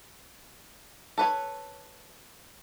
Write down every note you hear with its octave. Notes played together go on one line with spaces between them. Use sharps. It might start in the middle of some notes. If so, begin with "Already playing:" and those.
A4 B4 C#5